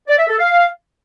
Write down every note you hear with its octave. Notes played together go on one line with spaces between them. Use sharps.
D5
E5
A4
F5